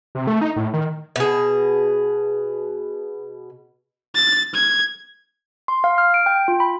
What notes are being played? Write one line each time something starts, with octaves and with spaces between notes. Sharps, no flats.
C3
A3
D#4
A2
D#3
B2 G#4
A6
G#6
C6
F5
F6
D7
G5
F4
B5